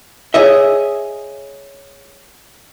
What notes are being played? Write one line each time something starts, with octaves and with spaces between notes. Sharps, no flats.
G#4 C#5 D#5 E5